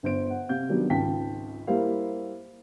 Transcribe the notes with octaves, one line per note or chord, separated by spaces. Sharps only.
G1 C5 D7
F#5
C3 F5 G6
D#3 F#3 G3 B3 D4
G#1 C#2 F4 G5 A5 B6
G3 A#3 E4 A#4 C5 F5